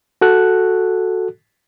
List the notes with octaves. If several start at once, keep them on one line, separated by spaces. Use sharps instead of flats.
F#4 A4 F#6